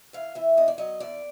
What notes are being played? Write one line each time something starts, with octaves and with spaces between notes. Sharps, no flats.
E3 F5
E3 E5
E2 D#5
D5
F#3 D#5
E2 D5